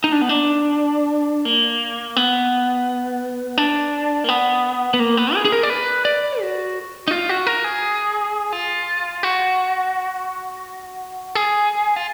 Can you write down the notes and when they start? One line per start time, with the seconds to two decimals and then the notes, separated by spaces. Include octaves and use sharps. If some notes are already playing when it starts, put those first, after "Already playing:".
0.04 D#4
0.12 D4
0.21 B3
0.29 D4
1.45 A#3
2.16 B3
3.58 D4
4.24 A#3
4.29 B3
4.94 B3
5.00 A#3
5.17 B3
5.35 G#4
5.45 G#4
5.52 A#4
5.63 D5
5.70 B4
6.05 D5
6.41 F#4
7.08 D#4
7.11 F4
7.29 F#4
7.47 A#4
7.64 G#4
8.52 F4
9.23 F#4
11.35 G#4
11.96 F4